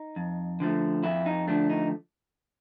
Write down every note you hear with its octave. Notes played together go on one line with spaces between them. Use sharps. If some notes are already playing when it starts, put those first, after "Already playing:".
Already playing: D#4
F2
D3 F3 A3
F2 E4
D#4
D3 F3 A3 D4
D#4